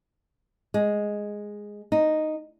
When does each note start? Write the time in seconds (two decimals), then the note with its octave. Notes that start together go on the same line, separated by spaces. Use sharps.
0.74 G#3
1.92 D#4